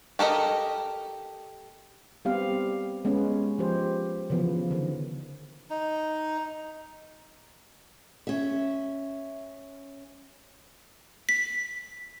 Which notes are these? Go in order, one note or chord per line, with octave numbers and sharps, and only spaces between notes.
G4 A4 A#4 D#5
G3 B3 C4 G4 F5
G#3 B3 C#4
F3 G4 C5
C#3 E3 F3 B3
D3 D#3
D#4
C#4 E5
B6